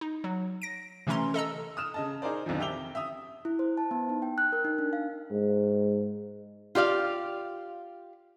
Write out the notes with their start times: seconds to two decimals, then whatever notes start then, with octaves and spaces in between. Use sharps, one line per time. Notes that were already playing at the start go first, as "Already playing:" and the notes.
0.01 D#4
0.24 F#3
0.62 A#6 D7
1.07 C3 E3 A3 C#4 A#5 C6
1.34 A4 D#5 A#5 E6
1.77 D#6 F6 E7
1.94 C#3 D#5 A5
2.22 D#4 G#4 A#4 C5 D5
2.46 B1 F2 D3 D#3 F3
2.60 C3 E5 G5 D6 F7 G7
2.95 E5 D#6
3.45 E4
3.59 C5
3.78 A5
3.91 B3
4.09 D#4
4.22 G5
4.38 F#6
4.52 A#4
4.65 D#4
4.79 D4
4.93 F5
5.31 G#2
6.75 F4 G4 D5 F5